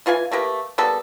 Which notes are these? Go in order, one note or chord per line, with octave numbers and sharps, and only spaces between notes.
E3 F4 B4 G#5
A3 A#3 G4 B4
G3 A#3 B3 A4